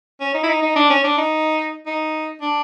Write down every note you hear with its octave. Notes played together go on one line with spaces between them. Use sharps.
C#4
D#4
E4
D#4
D#4
D4
C#4
D4
D#4
D#4
D4